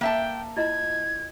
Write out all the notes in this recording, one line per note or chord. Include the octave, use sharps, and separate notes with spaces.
A#3 E5 G5 A5
E4 F4 D#5 G#6